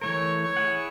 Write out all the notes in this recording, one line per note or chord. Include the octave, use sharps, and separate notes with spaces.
E3 A3 A#4 C#5
C#5
E4 G#4 F#5